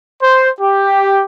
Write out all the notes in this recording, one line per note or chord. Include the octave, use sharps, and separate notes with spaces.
C5
G4